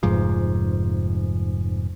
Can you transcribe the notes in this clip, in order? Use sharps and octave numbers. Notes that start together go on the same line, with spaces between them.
F1 G#2 F3